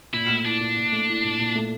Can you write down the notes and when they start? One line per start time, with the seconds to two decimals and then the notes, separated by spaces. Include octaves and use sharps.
0.13 A#2 E4
0.29 A3
0.45 D4 E4
0.61 A#2
0.76 A#2
0.92 A3
1.09 E4
1.24 A#2
1.40 A#2
1.55 A3